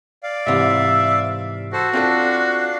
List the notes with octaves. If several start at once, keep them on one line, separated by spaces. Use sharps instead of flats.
D5 F5
G#2 C3 E3 E5
F#4 A4 C5
C4 D4 F4 A4 F5